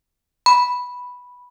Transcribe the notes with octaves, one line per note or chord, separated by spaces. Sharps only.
B5